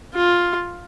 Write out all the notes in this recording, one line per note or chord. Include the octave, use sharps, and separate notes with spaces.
F4